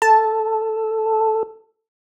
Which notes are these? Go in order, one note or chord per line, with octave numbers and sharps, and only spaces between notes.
A4 A5